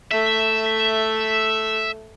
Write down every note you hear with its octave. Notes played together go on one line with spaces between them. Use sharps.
A3 E5